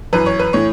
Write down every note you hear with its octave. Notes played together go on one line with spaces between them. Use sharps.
F#2 E3 B4
C#5
B4
A2 E3 C#5